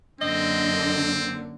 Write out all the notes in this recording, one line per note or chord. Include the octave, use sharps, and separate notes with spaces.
F#2 D3 A#3 C4 D#5